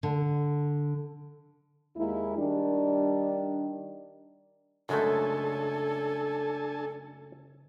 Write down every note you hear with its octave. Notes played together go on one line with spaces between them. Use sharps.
D3
D#2 G#3 A#3 E4
D#3 G3 D4
F#2 C#3 G#3 A3 D4 A4 G#5 A5